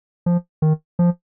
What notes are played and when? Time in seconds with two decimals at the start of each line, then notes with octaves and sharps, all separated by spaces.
0.26 F3
0.62 D#3
0.99 F3